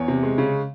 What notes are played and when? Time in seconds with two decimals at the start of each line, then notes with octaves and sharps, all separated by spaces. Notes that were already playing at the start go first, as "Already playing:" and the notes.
Already playing: E2 C#5
0.08 C3
0.23 G#3
0.38 C#3